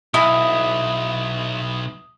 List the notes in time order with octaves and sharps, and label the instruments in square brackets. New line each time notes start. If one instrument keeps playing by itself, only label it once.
[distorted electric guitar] B1 [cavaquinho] E4 G#5 [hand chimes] D#6